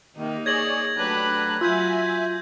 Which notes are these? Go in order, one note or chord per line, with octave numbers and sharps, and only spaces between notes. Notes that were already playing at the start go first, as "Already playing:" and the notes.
C3 D#3 A#3 D#4
G#4 C#5 D5 G#6 A#6 F#7
F#3 A3 D4 G4 B4 F#6
F#3 F4 E5 G#5 E6 G6 G#6